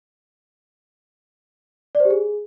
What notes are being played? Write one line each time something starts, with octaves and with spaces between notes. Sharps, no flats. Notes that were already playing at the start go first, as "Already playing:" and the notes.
D5
C5
G4
G#4